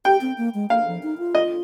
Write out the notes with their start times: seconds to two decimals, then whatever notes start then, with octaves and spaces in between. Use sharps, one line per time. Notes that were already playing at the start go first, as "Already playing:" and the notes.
0.05 G4 G5
0.21 C4
0.38 A#3
0.54 G#3
0.70 A#3 F5
0.87 F3
1.03 D#4
1.18 F4
1.35 D#5